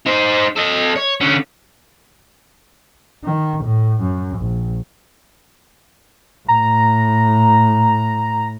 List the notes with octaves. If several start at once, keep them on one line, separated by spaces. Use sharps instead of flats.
D#4 C5
A4 D#5
C#5
D3 C#4
D#3
A2
F#2
A#1
A2 A#5